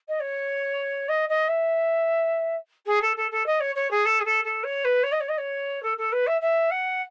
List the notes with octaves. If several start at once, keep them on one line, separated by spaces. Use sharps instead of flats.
D#5
C#5
D#5
D#5
E5
G#4
A4
A4
A4
D#5
C#5
C#5
G#4
A4
G#4
A4
A4
C#5
B4
C#5
D#5
C#5
D#5
C#5
A4
A4
B4
E5
E5
F#5